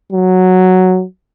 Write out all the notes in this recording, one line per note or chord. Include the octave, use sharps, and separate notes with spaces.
F#3